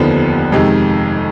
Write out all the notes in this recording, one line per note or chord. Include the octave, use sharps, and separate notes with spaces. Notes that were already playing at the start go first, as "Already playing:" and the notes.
Already playing: F1 D#2 D3 F3 B3
F2 C3 D#3 G#3